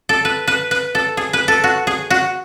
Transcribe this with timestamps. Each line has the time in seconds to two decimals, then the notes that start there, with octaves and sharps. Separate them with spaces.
0.09 A4
0.25 B4
0.47 B4
0.71 B4
0.95 A4
1.17 G#4
1.33 B4
1.48 A4
1.64 F#4
1.87 G#4
2.10 F#4